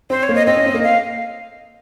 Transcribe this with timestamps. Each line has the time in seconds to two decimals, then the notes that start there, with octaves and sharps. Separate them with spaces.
0.10 C4 C5
0.23 C#5
0.29 A#3
0.35 D#5
0.47 C4 D#5
0.56 C#4
0.66 C4
0.74 A#3
0.83 F5